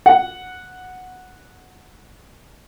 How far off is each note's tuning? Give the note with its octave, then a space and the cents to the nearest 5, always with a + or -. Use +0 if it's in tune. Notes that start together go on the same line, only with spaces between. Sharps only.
F#5 -10